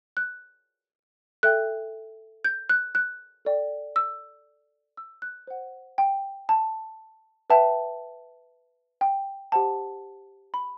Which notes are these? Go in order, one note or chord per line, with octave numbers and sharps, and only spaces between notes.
F#6
A4 E5 G5 F#6
G6
F#6
F#6
A4 D5 G5
E6
E6
F#6
C5 F#5
G5
A5
B4 E5 G5 A5
G5
G4 C5 F#5 A5
B5